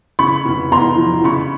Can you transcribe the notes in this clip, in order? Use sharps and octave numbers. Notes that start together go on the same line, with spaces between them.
C#3 B5 C#6
F1
E2 A#5 C6
F3
C#3 B5 C#6